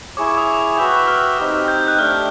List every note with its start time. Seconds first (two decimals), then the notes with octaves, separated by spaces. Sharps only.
0.17 E4 G#4 C#5 D6
0.28 D6
0.38 D#6
0.77 F#4 B4 E5 G5
1.08 F6
1.38 C4 D#4 G4
1.68 G6
1.88 F#6
1.98 A3 D4 G4 F6